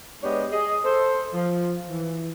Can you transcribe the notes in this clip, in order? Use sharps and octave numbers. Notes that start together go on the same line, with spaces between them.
G#3 B3 D4 G4 C#5 D#5
G#4 D#5
A4 C5
F3
E3